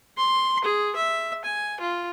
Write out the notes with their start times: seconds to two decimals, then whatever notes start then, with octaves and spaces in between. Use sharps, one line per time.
0.18 C6
0.64 G#4
0.96 E5
1.45 G#5
1.80 F4